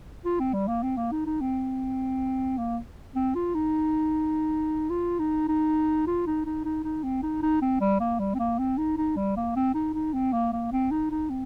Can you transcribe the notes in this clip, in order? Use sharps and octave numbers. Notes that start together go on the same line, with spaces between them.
F4
C4
G3
A#3
C4
A#3
D#4
D#4
C4
A#3
C4
F4
D#4
F4
D#4
D#4
F4
D#4
D#4
D#4
D#4
C4
D#4
D#4
C4
G3
A#3
G3
C4
A#3
C4
D#4
D#4
G3
A#3
C4
D#4
D#4
C4
A#3
A#3
C4
D#4
D#4
C4